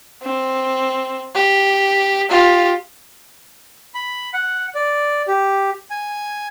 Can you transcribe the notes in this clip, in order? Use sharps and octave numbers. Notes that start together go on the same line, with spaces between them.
C4
G4
F4 G4
B5
F#5
D5
G4
G#5